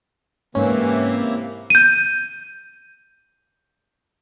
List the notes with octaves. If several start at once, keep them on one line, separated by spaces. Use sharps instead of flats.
G#2 C3 E3 A#3 C#4
G6 D#7